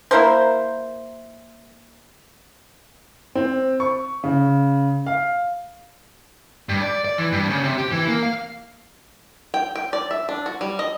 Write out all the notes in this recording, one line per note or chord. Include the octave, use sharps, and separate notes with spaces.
A#3 E4 A#4 C5
C4
C#6
C#3
F5
G2
D5
D5
E3
G2
C#3
C3
G4
E3
A#3
F5
G5
G5
D5
E5
D4
F#4
G3
D#5